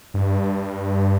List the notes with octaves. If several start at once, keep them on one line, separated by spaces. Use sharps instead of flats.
G2